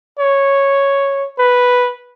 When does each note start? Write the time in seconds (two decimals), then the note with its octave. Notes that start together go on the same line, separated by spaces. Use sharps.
0.19 C#5
1.38 B4